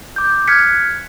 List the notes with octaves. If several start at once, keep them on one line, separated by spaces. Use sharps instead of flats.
D6 G6
F6 F#6 G#6 B6 C#7